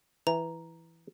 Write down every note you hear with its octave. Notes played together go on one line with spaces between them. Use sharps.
E3 A#5